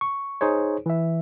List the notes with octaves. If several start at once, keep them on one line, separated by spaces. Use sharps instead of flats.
C#6
D#4 G#4 C5 C#5
E3 E5